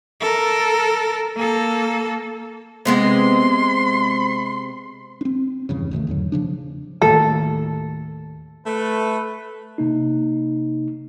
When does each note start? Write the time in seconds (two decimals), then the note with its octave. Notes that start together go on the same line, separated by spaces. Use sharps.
0.21 A4 A#4
1.36 A#3 A4
2.85 C3 G#3 B3 C6
5.21 C4 D4
5.69 F1 E2 G2 C#3
5.91 C#2 B2 D#3 A3
6.07 E2 G#2 D3 F#3
6.32 D#1 C#3 F3 D4
7.02 D#2 A2 A4
8.65 A3 B4
9.78 C3 A#3 D#4